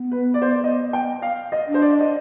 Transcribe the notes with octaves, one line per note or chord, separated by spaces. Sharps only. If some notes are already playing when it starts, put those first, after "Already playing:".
Already playing: B3
B4
D5
C5
D5
D#5
G5
F5
D#5
D4
C5
D5
D#5